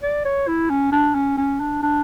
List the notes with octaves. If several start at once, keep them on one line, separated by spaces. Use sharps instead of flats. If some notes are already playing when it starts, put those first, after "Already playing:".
D5
C#5
E4
C#4
D4
C#4
C#4
D4
D4